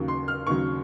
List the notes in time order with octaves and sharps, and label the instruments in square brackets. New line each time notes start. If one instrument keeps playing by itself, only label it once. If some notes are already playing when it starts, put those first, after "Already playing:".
Already playing: [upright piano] D#2 C#3 F#3
C6
F6
D#2 C#3 F#3 C#6